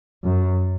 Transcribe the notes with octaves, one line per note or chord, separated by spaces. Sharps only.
F#2